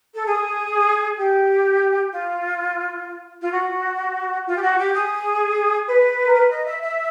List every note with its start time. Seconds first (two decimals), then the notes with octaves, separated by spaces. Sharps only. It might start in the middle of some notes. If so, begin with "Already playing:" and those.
0.15 A4
0.25 G#4
1.18 G4
2.12 F4
3.42 F4
3.53 F#4
4.47 F4
4.56 G4
4.63 F#4
4.78 G4
4.94 G#4
5.88 B4
6.24 A#4
6.34 B4
6.50 D#5
6.65 E5
6.82 E5